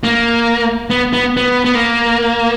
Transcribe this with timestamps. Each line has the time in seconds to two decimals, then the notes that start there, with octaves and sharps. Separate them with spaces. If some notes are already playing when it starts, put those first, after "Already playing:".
0.03 A#3
0.90 B3
1.13 B3
1.37 B3
1.65 B3
1.75 A#3